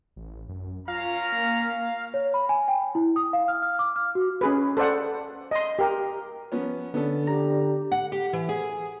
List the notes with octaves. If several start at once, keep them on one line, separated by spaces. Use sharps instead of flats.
A1
F#2
C#4 F4 A#4 F5 A#5
A#3
C#5
B5
G#5
G5
E4
D#6
F5
F6
F6
D6
F6
F#4
C#4 G#4 B4
A4 C5 D5 F#5
D#5 C6
G4 A#4
F3 B3 C#4
D3 B3 C#4 A4
G4 A#5
F#5
G4
E3
G#4